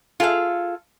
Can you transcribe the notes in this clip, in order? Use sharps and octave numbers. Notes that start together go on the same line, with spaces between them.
F4 G#4 A4 E5 F5